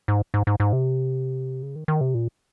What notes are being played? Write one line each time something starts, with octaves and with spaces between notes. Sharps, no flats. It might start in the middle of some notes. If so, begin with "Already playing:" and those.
G#2
G#2
G#2
G#2
C3
C#3
D#3
D#3
C3
A#2